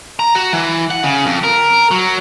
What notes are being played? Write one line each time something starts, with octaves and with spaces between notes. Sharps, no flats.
A#5
F#4
E3
F#5
C#3
F2
A#4
F#3